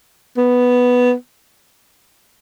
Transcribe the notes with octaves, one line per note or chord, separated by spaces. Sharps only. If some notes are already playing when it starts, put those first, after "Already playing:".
B3